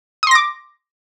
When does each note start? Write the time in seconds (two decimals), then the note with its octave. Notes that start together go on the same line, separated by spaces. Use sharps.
0.23 D#6
0.27 C6
0.31 A#6
0.35 D6